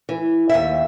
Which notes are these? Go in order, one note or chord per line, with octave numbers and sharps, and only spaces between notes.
E3
D#2 E5